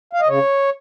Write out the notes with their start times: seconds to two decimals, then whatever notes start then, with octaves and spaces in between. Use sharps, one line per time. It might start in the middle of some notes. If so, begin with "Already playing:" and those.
0.13 F5
0.21 D#5
0.28 C#3 C#5